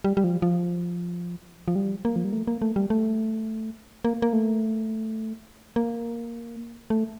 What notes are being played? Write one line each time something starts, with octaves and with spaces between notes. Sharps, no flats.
G3
G3
F3
F3
F3
G3
A#3
F3
G3
A3
A#3
A3
G3
A3
A#3
A#3
A3
A#3
A3